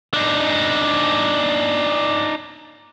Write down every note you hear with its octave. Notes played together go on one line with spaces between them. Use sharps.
D4 D#4